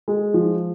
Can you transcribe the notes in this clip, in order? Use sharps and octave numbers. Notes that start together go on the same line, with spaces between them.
G#3
F3